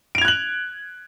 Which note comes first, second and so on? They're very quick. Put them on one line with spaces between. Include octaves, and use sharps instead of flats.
D7 F7 G#6 F#6 F#7